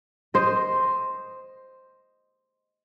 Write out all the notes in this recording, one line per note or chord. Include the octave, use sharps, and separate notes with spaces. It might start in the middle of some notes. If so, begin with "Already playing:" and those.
C5 D#5